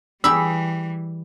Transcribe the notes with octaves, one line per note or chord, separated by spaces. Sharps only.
E3 G3 G4 G#4 B5 E6